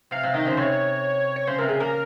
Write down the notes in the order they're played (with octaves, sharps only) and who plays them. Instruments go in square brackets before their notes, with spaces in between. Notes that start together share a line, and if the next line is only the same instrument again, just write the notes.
[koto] C3 [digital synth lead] F5
[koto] C3
[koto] D#3 [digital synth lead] D#5
[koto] C#3 [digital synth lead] C5
[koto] C3 [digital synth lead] C#5
[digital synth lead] C#5
[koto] C#3 [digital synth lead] C5
[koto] C3 [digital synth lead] A#4
[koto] C#3 [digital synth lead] G#4
[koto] A#3 [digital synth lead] A#4